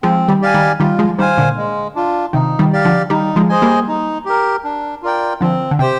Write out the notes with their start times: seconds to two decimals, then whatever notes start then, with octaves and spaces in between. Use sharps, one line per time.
0.03 F3 G#3 C4
0.28 D#3 G3
0.42 G4 D5 F5 G#5
0.54 D#3 G3
0.80 D#3 G3 F4
0.99 F3 G#3
1.18 D#3 G3 C5 F5 G#5
1.38 A#2 D3
1.57 G#3
1.96 D4 F4
2.33 C3 D#3 D#4
2.59 D#3 G3
2.73 G4 D5 F5
2.85 D3 F3
3.10 D#3 G3 D#4
3.36 F3 G#3
3.49 G#4 C5 D#5 G#5
3.62 G3 A#3
3.88 D#4
4.25 G4 A#4
4.64 D4
5.02 F4 A#4 D5 G5
5.41 D3 F3 C4
5.71 D3
5.79 C3 G4 C5 G5